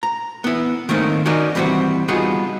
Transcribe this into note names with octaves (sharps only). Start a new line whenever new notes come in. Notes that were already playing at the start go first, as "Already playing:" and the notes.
A#5
B3 E4
D#3 A3 A#3 C4 C#4 D#4
C#4 D#4 F#4 A#4 D5 D#5
E3 G3 C4 E4 F#4
G3 B3 D#4 F4 F#4 G#4